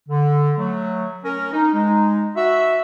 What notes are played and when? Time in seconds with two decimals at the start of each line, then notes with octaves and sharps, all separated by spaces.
0.08 D3
0.57 F#3 A3
1.24 C#4 A#4
1.53 D#4
1.73 G#3 D#4
2.36 F#4 E5